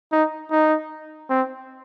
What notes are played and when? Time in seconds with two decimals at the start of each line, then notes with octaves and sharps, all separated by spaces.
0.12 D#4
0.51 D#4
1.30 C4